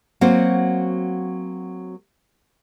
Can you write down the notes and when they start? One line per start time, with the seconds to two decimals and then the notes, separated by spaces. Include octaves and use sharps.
0.21 F#3 A#3 C4 F#4